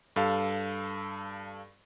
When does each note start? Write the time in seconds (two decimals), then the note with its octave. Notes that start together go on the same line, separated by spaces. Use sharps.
0.16 G2 A4 F5